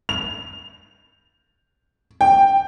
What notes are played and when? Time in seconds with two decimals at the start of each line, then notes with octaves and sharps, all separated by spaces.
0.09 F7
2.21 G5